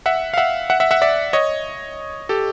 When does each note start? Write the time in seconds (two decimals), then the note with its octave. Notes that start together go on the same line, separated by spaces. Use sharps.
0.06 E5 F#5
0.34 F5
0.37 E5 F#5
0.70 E5 F#5
0.80 E5 F#5
0.91 E5 F#5
1.02 D5 E5
1.33 C#5 D#5
2.29 G4 A4